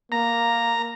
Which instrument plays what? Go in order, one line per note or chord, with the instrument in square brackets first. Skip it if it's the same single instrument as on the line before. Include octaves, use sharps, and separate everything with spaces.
[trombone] A#3 [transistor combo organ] A#5